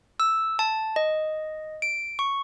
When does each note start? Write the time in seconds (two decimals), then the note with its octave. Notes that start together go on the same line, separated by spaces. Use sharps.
0.20 E6
0.59 A5
0.96 D#5
1.82 D7
2.19 C#6